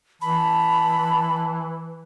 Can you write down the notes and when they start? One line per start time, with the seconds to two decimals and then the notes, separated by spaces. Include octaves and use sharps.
0.22 E3 A5 B5